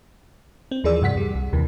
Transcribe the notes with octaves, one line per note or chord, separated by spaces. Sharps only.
C4
D#2 E3 F3 G#4 D5 E6
G2 C3 F#5 B6
G2 G3
C2
D#2 C3 E3